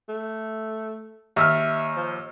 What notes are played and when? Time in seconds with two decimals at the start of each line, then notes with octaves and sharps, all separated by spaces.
0.09 A3
1.36 D#2 E5 E6 F6
1.96 F3